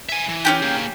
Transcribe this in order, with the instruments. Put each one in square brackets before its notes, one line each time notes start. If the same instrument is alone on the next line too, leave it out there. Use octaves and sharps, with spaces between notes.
[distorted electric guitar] E5 G#5
E3
[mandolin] C#4 F#4 G4
[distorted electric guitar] A#3 G#4